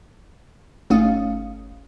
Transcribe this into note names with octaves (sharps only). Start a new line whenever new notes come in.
G1 A3 C#4 D#4 F5 D#6